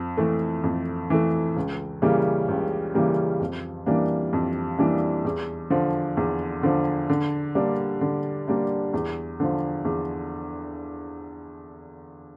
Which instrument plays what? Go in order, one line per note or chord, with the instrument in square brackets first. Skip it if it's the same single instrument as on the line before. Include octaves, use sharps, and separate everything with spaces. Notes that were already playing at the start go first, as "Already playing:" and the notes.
Already playing: [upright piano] F2
E3 A3
F2
E3 A3
C#2
C#3 E3 G3 A#3
C#2
C#3 E3 G3 A#3
F2
E3 G3 A#3 D4
F2
E3 G3 A#3 D4
E2
D3 F3
E2
D3 F3
D3
G3 A#3 D4
D3
G3 A#3 D4
E2
D3 F3
E2